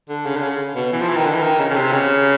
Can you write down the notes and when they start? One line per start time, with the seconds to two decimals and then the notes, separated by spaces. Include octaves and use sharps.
0.09 D3
0.26 C#3
0.36 D3
0.43 C#3
0.76 B2
0.93 E3
1.00 F3
1.09 E3
1.17 D#3
1.26 D3
1.34 E3
1.43 D#3
1.59 C#3
1.70 C#3
1.75 C3
1.92 C#3